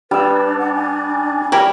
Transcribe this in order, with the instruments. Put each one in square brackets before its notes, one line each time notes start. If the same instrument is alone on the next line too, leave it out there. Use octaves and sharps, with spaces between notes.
[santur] G3 E6 [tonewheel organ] D4 [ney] B4
[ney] F#5
G#5
[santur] G3 C#5 [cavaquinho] E4 G4 A#4